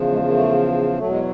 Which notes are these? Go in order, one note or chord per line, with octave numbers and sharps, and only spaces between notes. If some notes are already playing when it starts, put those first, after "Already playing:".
Already playing: E2 C#3 F3
G#3
A#3
A3
E2 B2 F#3 A3
G#3